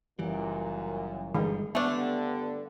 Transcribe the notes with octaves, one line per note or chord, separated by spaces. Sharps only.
F#1 F#2 A#2 E3 G3
G1 G2 D#3 E3 G3 G#3
G2 D3 A3 B3 D4